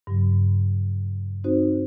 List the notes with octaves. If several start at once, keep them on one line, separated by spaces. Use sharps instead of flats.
G2 C#3 F#3
C4 D#4 F#4 C5